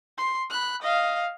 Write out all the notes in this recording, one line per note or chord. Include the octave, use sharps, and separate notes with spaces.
C6
B5 F#6
D#5 F5